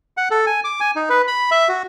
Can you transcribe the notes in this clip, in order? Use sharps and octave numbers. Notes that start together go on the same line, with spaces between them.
F#5
A4
G#5
D6
G#5
D#4
B4
B5
E5
F#4